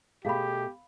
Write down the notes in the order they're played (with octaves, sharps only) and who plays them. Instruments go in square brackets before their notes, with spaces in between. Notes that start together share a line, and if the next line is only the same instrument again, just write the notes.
[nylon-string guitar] B2 A3 G#4 [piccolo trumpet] G4 [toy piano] F5 B5